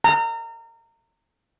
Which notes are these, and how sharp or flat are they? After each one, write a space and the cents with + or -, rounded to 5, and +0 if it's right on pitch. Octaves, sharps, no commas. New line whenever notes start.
A#5 -25